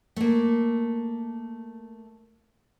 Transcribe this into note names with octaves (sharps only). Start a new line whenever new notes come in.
A3 A#3